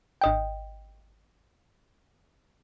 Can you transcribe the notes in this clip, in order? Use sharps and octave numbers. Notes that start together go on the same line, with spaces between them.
G#1 D#5 G5